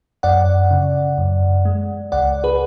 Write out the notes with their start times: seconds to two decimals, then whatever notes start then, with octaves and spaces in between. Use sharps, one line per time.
0.23 F#2 D5 F#5
0.71 C#3
1.18 F#2
1.65 G#3
2.12 C#2 D5 F#5
2.44 G#4 B4